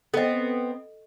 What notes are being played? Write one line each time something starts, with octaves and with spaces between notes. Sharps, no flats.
B3 C4 A4 D#5